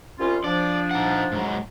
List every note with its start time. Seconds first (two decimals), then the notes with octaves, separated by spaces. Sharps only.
0.19 C2 C#4 F4
0.44 F3 D4 D5
0.91 D#4 F#5
1.32 G#2 F#3